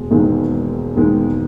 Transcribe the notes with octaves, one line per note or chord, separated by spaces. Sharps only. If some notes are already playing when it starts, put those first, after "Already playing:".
Already playing: E1 G#3
E1 D#2 D#3 G#3
E1 D#2 D#3 G#3